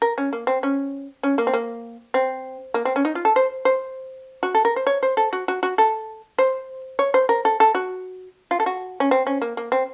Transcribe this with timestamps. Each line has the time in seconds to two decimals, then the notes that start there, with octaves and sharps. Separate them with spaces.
0.02 A#4
0.18 C#4
0.33 A#3
0.47 C4
0.63 C#4
1.23 C#4
1.38 A#3
1.47 C4
1.53 A#3
2.14 C4
2.74 A#3
2.85 C4
2.96 C#4
3.05 D#4
3.15 F4
3.25 A4
3.36 C5
3.65 C5
4.43 F#4
4.55 A4
4.65 A#4
4.76 C5
4.87 C#5
5.03 C5
5.17 A4
5.33 F#4
5.48 F#4
5.63 F#4
5.78 A4
6.38 C5
6.99 C#5
7.14 C5
7.29 A#4
7.45 A4
7.60 A4
7.75 F#4
8.51 F4
8.60 A4
8.66 F#4
9.00 C#4
9.11 C4
9.27 C#4
9.42 A#3
9.57 A#3
9.72 C4